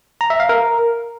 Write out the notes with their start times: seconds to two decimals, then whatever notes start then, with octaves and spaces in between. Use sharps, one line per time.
0.21 A#5
0.30 E5
0.40 F5
0.49 A#4